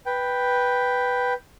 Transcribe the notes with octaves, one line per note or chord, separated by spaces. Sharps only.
B4 G5